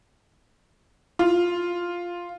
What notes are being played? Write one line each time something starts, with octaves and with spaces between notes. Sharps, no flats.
F4